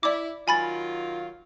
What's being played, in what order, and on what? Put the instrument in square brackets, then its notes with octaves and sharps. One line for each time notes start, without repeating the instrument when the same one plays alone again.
[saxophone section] E4 [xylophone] D5 D6
[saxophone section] D#3 F#3 F4 [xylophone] G#5 B5 A6